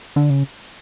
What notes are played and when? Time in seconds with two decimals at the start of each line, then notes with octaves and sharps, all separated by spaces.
0.16 D3
0.30 C#3